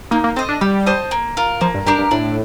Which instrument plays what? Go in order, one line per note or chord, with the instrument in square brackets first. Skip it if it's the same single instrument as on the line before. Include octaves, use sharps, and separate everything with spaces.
[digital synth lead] A#3 [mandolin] D#4
[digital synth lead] A#3
[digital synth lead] C4 [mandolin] A4 D#5
[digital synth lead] D4
[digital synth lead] G3 [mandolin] G4
[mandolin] C5 D#5 A5
A#3
F4 A#4
[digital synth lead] F3 [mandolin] A#3
[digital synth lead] G2
[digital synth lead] G2 [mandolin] D4 G4 A#4
[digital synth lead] G2
[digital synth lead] A2 [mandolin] D4